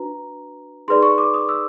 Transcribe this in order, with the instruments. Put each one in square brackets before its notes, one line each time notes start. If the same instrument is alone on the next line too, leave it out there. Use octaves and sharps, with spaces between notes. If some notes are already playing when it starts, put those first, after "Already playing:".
Already playing: [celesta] D4 F#4 B4 A#5
D#4 G#4 B4 D5 C6
C#6
D6
D#6
E6